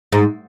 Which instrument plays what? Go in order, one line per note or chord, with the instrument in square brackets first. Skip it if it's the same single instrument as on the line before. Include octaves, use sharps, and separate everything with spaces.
[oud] G#2